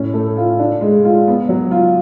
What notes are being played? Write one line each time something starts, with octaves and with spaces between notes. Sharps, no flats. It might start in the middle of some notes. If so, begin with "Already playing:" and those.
Already playing: A2 C#4
A3
F4
D4
G#3
F4
B3
F#3
F4